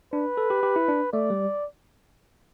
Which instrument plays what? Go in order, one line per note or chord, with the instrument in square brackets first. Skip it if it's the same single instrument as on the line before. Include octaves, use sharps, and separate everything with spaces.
[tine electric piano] D4 [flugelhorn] B4
[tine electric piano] A4
G4
G4
E4
D4
[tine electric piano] A3 [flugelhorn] D5
[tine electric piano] G3